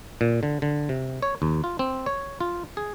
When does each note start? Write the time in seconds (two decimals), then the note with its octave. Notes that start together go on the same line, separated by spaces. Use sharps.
0.21 A#2
0.43 D3
0.62 D3
0.89 C3
1.22 C#5
1.42 D#2
1.64 F4
1.79 C4
2.06 C#5
2.41 F4
2.77 G#4